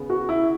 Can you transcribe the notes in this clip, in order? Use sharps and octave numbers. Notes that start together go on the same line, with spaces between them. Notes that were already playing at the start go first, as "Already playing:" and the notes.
Already playing: C#3 B3
F#4
E4